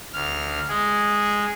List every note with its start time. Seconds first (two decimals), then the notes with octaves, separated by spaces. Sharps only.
0.13 D2 F6
0.69 G#3 G#4